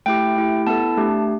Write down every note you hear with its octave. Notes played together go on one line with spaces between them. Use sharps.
A3 E4 G4 G5
A3 E4 G4
B3 E4 A4 A5
A3 D4 G4